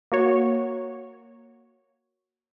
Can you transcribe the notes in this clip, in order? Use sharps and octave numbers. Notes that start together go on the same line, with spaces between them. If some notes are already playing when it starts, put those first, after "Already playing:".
A#3 F#4 C#5